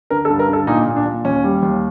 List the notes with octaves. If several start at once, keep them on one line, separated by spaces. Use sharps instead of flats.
D3 A#4
A4
G2
A#4
D3 A4
A#2 D#4
A#2
D4
A#2
D#2 C#4
G3
D#2